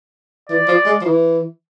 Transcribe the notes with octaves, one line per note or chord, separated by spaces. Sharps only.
E3 D5
F3
G#3
F3
E3